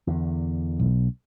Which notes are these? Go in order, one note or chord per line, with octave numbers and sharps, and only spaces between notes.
E2 D3
B1